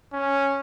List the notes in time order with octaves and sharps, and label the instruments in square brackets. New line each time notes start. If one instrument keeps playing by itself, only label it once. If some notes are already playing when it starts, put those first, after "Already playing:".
[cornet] C#4